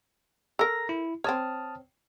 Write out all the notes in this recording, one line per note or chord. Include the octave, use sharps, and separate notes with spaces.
A4 A#4 A#5 A#6
E4
C4 C#5 A5 D#6 F6